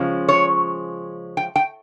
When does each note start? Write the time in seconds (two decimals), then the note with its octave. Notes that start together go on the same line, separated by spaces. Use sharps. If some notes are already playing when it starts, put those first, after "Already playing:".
Already playing: C#3 F3 G#3 C#4
0.29 C#5
1.37 G5
1.56 G5